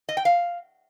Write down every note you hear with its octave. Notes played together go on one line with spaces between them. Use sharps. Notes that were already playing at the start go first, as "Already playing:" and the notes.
D#5
G5
F5